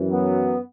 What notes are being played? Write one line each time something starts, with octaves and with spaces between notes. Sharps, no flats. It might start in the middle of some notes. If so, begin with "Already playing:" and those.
Already playing: F#2 E3
F#3 B3